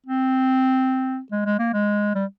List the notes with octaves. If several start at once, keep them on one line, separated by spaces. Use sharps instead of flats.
C4
G#3
G#3
A#3
G#3
G3